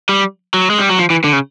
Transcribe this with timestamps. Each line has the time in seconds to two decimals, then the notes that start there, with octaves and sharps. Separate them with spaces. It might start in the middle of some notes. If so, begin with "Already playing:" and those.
0.09 G3
0.54 F#3
0.70 G#3
0.79 G3
0.90 F#3
0.99 F3
1.10 E3
1.24 D3
1.33 C#3